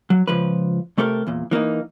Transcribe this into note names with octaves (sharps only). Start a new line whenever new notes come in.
F#3
C#2 F3 B4
C3 A3 G4 A4 A#4
E2 A#2
E3 A#3 B3 D#4